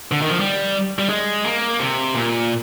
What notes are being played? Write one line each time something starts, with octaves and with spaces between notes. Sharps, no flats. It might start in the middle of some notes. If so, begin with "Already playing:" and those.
D3
D#3
F3
G3
G3
G#3
A#3
C3
A#2